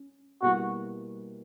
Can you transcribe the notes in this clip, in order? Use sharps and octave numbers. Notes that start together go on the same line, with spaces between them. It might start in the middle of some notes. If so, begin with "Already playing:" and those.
Already playing: C#4
B2 G3 A#3 E4 F#4